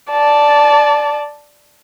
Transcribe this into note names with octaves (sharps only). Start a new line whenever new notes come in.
D5 A5